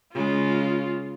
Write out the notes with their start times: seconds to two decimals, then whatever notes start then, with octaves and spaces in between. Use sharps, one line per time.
0.14 C#3 G#3 F4